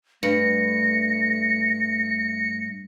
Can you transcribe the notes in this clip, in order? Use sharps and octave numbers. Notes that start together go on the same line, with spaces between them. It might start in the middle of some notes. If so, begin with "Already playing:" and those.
G2 A3 A#6 C#7